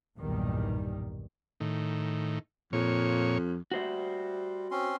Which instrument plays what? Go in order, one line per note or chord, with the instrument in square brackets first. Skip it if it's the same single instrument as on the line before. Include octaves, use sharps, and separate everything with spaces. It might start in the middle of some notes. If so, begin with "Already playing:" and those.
[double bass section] B1 E2 G2 A#2 D#3 G3
[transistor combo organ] A2 D#3
[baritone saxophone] F2 [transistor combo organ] A#2 C#5
[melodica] G3 [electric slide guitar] F#4 C5 E5
[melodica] C4 C#4 C6